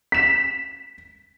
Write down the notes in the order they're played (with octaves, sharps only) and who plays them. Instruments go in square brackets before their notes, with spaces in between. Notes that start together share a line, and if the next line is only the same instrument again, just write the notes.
[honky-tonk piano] B6 E7